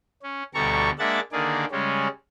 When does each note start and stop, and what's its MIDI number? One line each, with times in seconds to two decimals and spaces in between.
0.23 0.43 61
0.54 0.90 38
0.54 0.90 47
0.54 0.90 55
0.54 0.90 69
0.54 0.90 82
0.54 0.90 85
0.99 1.20 56
0.99 1.20 58
0.99 1.20 62
0.99 1.20 76
0.99 1.20 78
0.99 1.20 93
1.32 1.65 50
1.32 1.65 51
1.32 1.65 58
1.32 1.65 68
1.32 1.65 74
1.71 2.07 49
1.71 2.07 55
1.71 2.07 56
1.71 2.07 61